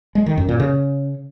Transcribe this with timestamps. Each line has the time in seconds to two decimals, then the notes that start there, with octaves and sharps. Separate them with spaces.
0.15 G#3
0.26 D#3
0.37 F#2
0.49 A#2
0.60 C#3